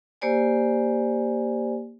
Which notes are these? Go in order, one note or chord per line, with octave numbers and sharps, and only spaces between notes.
A#3 G4 C5 D5 G#5